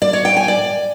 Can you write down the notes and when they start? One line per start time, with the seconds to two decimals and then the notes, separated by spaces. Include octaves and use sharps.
0.02 D5
0.13 C#5
0.25 G5
0.37 G#5
0.48 D5